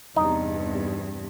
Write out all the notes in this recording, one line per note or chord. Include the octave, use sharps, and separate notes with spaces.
E2 G2 C3 D#4